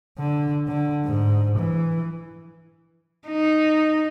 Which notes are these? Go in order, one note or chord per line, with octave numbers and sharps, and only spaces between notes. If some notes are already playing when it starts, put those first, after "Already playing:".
D3
D3
G#2
E3
D#4